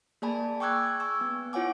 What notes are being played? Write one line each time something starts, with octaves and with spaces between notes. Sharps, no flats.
A#3 G#4 D5 G#5 A5 B5
G5 C#6 D6 E6 F#6 G#6
G#6
G#5 C#6 E6
B3
E4 F4 C#5 F#5 G#5 D6